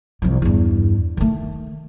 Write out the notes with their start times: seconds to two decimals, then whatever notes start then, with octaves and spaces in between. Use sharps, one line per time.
0.22 C2 F3
0.42 E2 G2
1.17 D#3 A3